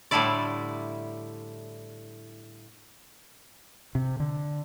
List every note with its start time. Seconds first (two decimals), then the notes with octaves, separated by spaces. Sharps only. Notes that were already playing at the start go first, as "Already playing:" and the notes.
0.11 A2 D3 G3 A3 E4 D5
3.95 C3
4.20 D3